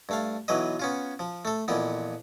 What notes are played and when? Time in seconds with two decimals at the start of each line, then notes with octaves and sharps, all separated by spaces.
0.09 G2 A3 F5
0.48 B1 E3 F#3 B4 D#5
0.79 B3 C#4 F4
1.19 F3
1.45 A3 A4
1.68 F2 A#2 E3 B3